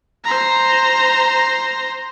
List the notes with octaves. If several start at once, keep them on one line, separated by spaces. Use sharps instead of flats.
C5 A#5